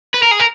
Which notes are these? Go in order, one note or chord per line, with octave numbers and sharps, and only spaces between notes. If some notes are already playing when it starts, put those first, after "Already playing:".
B4
A#4
G#4
A#4